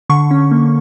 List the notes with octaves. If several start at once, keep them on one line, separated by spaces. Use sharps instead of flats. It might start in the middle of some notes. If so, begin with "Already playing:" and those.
D3 C#6
C#4
A#3